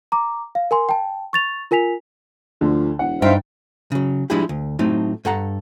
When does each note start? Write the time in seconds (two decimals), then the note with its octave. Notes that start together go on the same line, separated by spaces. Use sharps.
0.12 A#5 D6
0.55 F5
0.71 A#4 G#5 C6
0.89 G5 A5
1.33 C#6 A6 F7
1.71 F4 A#4 G#5 B6 F7
2.61 D2 D3 F3
2.99 E1 F#5
3.22 G2 D#4 C5 E5 F5 G5
3.92 C#3 F#3
4.30 F3 G3 G#3 D4 E4 G4
4.49 D2
4.79 A2 F#3 A3 C4 D#4
5.25 G2 A4 F#5 A#5